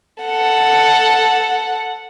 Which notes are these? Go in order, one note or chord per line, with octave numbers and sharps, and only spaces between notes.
A4 F#5